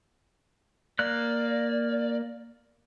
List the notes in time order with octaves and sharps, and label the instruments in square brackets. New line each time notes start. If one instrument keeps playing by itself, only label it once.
[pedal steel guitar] A#3 F#6 [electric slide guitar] D5